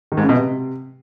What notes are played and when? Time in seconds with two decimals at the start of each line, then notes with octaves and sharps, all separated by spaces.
0.12 D#3
0.17 G#2
0.23 C#3
0.29 B2
0.35 C3